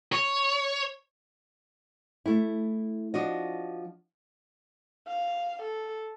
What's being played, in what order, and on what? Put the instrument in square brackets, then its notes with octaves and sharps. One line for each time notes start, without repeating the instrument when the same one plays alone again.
[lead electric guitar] C#5
[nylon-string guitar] A3 E4
F3 D4 F#4 D#5
[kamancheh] F5
A4